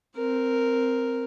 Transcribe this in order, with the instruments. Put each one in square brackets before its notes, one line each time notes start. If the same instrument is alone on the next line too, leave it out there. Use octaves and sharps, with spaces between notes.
[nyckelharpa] C4 A#4